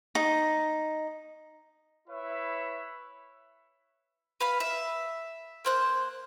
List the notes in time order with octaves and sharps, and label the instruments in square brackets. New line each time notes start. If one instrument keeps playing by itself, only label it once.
[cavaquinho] D#4
[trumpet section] E4 B4 C#5 E5
[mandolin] B4 F5 B5
E5
A#3 C5 F#6